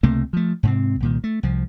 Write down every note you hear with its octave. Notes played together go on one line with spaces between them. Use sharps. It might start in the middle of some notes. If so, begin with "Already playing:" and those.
C#2 C3 A3 A#3
F3 A3
G#2 C3 C4
C2 A#2 D#3
A3
C2 F3